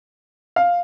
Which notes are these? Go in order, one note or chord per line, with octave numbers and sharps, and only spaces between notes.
F5